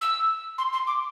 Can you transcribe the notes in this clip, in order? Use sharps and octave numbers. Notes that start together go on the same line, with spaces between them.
E6
C6
C6
D6